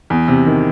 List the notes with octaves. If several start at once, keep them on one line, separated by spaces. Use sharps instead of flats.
E2
C3
D#3